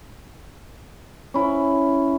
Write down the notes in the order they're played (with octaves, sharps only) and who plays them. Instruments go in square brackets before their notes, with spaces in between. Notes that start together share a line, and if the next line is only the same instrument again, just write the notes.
[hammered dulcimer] C#4 E4